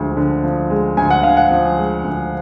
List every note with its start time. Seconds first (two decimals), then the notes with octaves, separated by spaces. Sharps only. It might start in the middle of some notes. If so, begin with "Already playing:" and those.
Already playing: D2 F3 G#3
0.17 D3
0.44 F3
0.70 G#3
0.97 D2 G#5
1.10 F#5
1.23 D3 F5
1.37 F#5
1.51 F3
1.78 G#3
2.04 D2